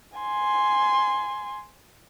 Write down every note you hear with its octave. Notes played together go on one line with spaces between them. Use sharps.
G#5 C6